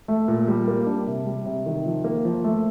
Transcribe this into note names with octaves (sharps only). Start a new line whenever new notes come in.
A3
A#2
G3
A#3
D4
C3
G3
C3
D#3
F3
A#3
F3
A3